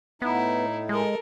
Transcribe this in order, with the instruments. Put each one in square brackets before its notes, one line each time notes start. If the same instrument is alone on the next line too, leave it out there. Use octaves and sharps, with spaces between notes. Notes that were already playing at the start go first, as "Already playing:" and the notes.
[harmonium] A2 D#4 [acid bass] B3 [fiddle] E4
[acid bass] G#3 [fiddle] A4 A#4